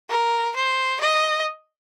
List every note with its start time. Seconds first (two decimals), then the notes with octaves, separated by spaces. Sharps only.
0.09 A#4
0.56 C5
1.01 D#5